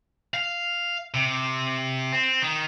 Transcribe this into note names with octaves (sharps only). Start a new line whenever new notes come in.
F5
C3
C4
D#3